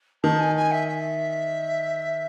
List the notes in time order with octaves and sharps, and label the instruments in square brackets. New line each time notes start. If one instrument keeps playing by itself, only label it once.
[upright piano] D#3 [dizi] A5
[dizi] G#5
G#5
E5
E5